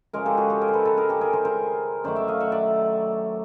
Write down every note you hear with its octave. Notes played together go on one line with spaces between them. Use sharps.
C#3 F3 G#3 G#4 A#4
G4 A4
F#4 G#4
G4 A4
G#4 A#4
C5
A4 B4
A4 B4
G#4 A#4
G4 A4
G#4 A#4
A#4 C5
A#4 C5
F#2 D#3 F#3 A3 C5 D5
D5 E5
D#5 F5
E5 F#5
D5 E5